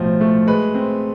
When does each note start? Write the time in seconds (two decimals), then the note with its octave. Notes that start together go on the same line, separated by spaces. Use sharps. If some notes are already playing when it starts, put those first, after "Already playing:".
Already playing: B1 A2 F3
0.21 A3
0.47 G#3 B4
0.75 C4